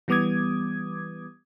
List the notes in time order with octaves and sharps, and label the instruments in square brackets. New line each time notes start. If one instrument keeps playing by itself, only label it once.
[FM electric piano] E3 G3 B3 D6 D#6 G#6